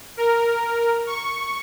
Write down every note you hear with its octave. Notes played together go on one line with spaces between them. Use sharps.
A#4
C#6